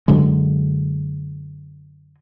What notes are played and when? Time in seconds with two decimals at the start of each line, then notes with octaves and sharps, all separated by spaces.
0.08 F#2 D3 F#3 G#3